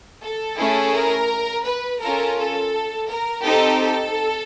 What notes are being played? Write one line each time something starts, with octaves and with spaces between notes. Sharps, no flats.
A4
A3 C#4 E4 G#4
A#4
B4
C#4 F4 A4 A#4
A4
A#4
C4 D#4 G4 A4
A4